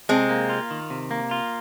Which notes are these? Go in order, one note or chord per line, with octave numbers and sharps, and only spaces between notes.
C3 G#3 C4
A#3
F4
D#3
C3
A#3
F4